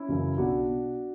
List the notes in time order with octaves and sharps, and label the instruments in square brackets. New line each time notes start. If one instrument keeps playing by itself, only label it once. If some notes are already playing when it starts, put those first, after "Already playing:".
Already playing: [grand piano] C#4 E4
F#2 C#3 E3
B1 D4 F#4
B2